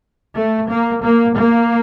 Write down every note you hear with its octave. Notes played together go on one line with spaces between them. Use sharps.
A3
A#3
A#3
A#3